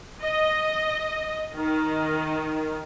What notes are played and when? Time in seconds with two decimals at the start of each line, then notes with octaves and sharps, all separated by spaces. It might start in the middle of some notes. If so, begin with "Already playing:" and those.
0.21 D#5
1.56 D#3